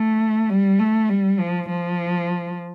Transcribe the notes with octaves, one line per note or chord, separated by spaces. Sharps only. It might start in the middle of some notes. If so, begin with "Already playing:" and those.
Already playing: A3
G3
A3
G3
F3
F3